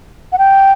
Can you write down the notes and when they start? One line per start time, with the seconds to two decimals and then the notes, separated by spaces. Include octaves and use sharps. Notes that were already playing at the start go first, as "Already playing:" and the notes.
0.32 F#5
0.38 G5